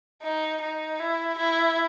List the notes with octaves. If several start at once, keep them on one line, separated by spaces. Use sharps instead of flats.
D#4
D#4
E4
E4